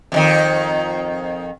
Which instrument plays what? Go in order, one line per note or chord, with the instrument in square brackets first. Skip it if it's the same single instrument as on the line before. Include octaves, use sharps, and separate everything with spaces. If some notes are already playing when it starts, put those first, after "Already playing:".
[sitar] F2 C3 D#3